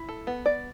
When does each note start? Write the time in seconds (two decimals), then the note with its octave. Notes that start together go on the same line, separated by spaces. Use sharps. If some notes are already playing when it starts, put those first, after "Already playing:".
Already playing: E4
0.09 A4
0.27 B3
0.46 D5